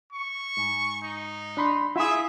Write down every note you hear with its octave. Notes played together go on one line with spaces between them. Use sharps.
C#6
G#2
D#4
D4 B5 C6
E4 F4 G#4 E5